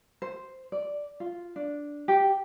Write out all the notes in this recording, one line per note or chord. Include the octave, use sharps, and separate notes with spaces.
C5
D5
F4
D4
G4